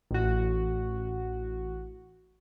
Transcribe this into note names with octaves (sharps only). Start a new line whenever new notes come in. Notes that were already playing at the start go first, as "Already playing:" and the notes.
A1 F#4